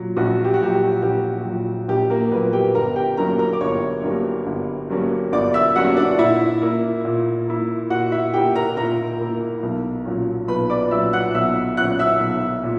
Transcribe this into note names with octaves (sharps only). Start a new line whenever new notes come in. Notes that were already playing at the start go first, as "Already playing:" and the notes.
Already playing: A#2 F#3
A#1 F#4
G4
F#4
A#2 F#3 G4
G4
A#1 G4
A#2 F#3
A#1 G4
A#3 A#4
A#2 F#3 B3 B4
G4 G5
G1 A#4 A#5
G4 G5
G2 F#3 A#3 C#4 A#4 A#5
A#4 A#5
D6
G1 C#5 C#6
G2 F#3 A#3 C#4
G1
G2 F#3 A#3 C#4
G1 D5 D6
E5 E6
G2 F#3 A#3 C#4 F#4 F#5
D4 D5
A#2 E4 E5
A#3 E4
A#2
A#3 E4
A#2 F#4 F#5
E4 E5
A#3 E4 G4 G5
A#4 A#5
A#2 A#4 A#5
A#3 E4
B1
A#2 F#3 C#4
B1 B4 B5
D5 D6
A#2 F#3 C#4 E5 E6
F#5 F#6
B1 E5 E6
A#2 F#3 C#4 F#5 F#6
E5 E6
B1
A#2